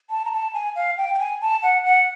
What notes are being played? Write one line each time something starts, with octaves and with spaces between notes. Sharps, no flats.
A5
A#5
A5
G#5
F5
G5
G5
G#5
A5
F#5
F#5